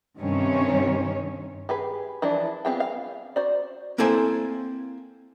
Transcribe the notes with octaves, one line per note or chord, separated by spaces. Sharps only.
G2 C3 D#3 C4 C#4 C#5
G4 G#4 B4
E3 F3 D4 E4
B3 C4 F4 G#4 G5
F5
F#4 C5 D5
A#3 C4 E4 A4 C5 G#5